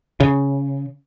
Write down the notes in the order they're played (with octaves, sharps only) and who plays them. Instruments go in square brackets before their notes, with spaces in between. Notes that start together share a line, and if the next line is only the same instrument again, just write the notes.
[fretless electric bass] C#3